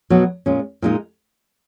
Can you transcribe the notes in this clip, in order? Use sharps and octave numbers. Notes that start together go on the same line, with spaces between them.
B2 F#3 B3
A#2 G#3 C#4
A#2 G#3 D#4